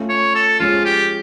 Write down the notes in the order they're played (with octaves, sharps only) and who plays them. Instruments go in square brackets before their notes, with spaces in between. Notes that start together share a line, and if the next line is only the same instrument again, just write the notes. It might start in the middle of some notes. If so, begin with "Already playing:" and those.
Already playing: [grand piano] A3 C#4 F4
[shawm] C#5
A4
[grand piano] F3 G#3 C#4 [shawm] F4
[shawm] G4